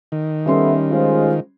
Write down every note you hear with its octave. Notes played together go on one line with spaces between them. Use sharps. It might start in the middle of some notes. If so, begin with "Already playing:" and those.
D#3
G3 B3 C#4 A4 E5 C6
G#3 F4 C5